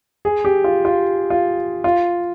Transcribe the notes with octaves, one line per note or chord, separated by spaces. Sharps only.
G#4
G4
F4
F4
F4
F4